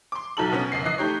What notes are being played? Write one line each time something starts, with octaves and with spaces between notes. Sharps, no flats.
C6 D6
B1 F#3 D#4 A4 F#7
B2 B3 C#4
F#1 B1 C7
E3 D#5 F#6 C7
A3 D#4 G4 C#5